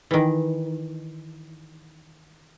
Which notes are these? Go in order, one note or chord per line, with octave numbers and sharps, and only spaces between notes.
D#3 E3